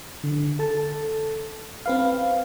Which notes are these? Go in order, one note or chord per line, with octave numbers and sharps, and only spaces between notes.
D3
A4 A5
C4 B4 F5